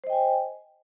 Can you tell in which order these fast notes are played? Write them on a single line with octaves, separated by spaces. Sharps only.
C5 D#5 G5 G#5